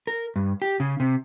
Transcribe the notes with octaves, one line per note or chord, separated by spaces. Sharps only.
A#4
G2
G4
C#3
C3